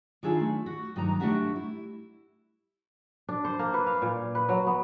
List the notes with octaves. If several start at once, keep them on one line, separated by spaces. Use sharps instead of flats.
D#3 D4 F4 G#4 E5 F5
A3
F#4
G2 D#3 F#3 D#4 A#5
A3 D4 F#4 G4 E5 F#5
E4
D4
C5
A#3
B4
F5
A#2
B4
F#3
B3